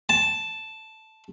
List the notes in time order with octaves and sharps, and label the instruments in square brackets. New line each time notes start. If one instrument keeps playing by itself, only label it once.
[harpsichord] A5